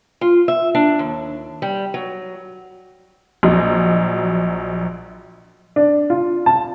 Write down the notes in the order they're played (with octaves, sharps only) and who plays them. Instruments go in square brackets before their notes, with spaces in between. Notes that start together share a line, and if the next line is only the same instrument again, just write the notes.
[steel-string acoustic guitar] F4
E5
D4
D#2
G3
F#3
[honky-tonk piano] A#1 F#3 D#5
[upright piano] D4
F4
A5